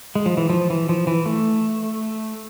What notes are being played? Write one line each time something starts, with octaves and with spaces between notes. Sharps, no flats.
G#3
F3
E3
F3
E3
F3
E3
A3